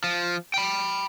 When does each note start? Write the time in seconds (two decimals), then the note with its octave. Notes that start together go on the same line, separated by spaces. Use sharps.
0.04 F3
0.54 G5 B5